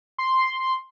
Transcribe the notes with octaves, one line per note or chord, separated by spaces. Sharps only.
C6